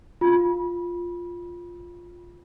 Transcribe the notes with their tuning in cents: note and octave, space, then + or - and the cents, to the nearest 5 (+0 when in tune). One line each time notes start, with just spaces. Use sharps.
F4 +0 B5 -25